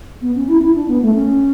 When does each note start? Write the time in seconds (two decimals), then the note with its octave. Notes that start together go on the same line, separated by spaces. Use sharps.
0.22 B3
0.35 C#4
0.48 E4
0.61 E4
0.75 D4
0.88 B3
1.02 A3
1.15 C#4